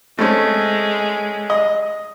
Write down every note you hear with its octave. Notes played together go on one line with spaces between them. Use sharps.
G#3 A3 C4 C#4
D#5